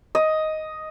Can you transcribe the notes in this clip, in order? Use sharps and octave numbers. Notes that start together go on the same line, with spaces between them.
D#5